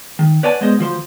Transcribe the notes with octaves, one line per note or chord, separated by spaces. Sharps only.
D#3
B4 C#5 D5 F#5 G#5 A5
G#3 B3 C5 D#5
D2 F3 C5